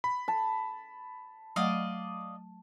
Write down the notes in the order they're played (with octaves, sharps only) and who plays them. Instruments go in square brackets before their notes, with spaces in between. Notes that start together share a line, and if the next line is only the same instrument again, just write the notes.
[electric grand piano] B5
[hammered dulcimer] A5
[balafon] F#3 A3 F#5 [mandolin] D5 D#5 F5